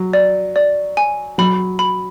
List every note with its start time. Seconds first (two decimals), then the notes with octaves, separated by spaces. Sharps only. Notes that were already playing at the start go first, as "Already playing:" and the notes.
Already playing: F#3
0.13 D5
0.56 D5
0.97 G#5
1.38 F#3 B5
1.79 B5